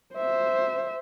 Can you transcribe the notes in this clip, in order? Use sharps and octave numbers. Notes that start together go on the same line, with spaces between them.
C5 E5